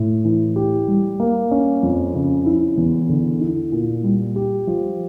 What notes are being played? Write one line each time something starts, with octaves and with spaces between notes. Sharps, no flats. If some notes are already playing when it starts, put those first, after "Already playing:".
Already playing: A2 E4
E3
G4
G3
A#3
C#4
F2
C#3
E4
E2
D3
E4
A#2
G3
G4
F3